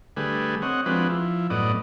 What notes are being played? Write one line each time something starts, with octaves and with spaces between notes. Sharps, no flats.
D3 G3 A3 G#4 B4
C4 C#5 D#5 F#5
F3 G#3 C4 D4 F#4 B4
F3 E4
F#2 A2 B3 D5 D#5